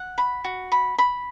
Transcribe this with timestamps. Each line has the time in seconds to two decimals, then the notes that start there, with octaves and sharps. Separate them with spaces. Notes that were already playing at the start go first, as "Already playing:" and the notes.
Already playing: F#5
0.18 B5
0.44 F#4
0.72 B5
0.98 B5